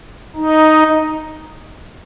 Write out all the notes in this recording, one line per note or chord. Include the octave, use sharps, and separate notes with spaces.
D#4